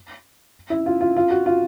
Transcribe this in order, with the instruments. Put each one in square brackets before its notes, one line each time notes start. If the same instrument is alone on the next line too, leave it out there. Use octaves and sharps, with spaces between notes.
[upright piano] E4
F4
F4
F4
F#4
F4